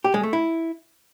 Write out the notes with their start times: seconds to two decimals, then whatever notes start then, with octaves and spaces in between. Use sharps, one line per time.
0.04 G4
0.14 G#3
0.23 A3
0.33 E4